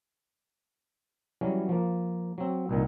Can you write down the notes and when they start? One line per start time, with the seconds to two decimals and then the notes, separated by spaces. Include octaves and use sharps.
1.41 E3 F#3 G3 C#4
1.69 F3 A#3
2.38 F#3 C4
2.69 C2 A#2 D#3